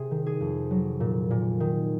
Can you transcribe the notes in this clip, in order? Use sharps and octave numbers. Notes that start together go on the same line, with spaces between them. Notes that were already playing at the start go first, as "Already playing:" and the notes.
Already playing: C3 G#4
D#3
G#4
F2
F#3
A#2
A#2
D#3